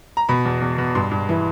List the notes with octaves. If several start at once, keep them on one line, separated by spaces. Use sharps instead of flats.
A#5
B2 B5
E2
E2
B2
G2 C6
G2
E3